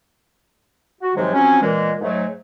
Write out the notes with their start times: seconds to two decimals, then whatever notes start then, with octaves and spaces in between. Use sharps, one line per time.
1.01 F#4
1.16 G#2 C3 D#3 F3 F#3 G#3
1.34 F3 F#3 C4 C#4
1.62 A#2 E3 G#3
2.01 G#2 F#3 A3